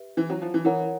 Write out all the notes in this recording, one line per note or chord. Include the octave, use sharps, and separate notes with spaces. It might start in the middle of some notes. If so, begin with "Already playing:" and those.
Already playing: G4 B4 E5
E3
F#3
F3
E3
E3 A#4 C#5 F#5 A#5